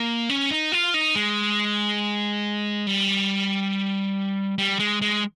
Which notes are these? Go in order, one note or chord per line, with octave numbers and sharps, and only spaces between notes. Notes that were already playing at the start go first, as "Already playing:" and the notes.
Already playing: A#3
C#4
D#4
F4
D#4
G#3
G3
G3
G#3
G#3